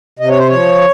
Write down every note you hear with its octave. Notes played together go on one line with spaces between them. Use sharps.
C3 D#5
C#5
C5
F3 C#5